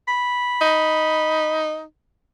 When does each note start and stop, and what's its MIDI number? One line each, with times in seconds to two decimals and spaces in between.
0.07 1.65 83
0.62 1.82 63